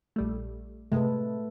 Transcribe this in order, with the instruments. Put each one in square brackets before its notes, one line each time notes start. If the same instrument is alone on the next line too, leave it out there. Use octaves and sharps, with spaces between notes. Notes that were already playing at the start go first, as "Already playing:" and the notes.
[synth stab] A#1 G3 A3
[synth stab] C3 G#3 [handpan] A3 A4 B4